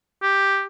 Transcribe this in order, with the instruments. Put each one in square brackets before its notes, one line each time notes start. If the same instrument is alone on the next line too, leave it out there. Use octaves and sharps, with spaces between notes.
[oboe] G4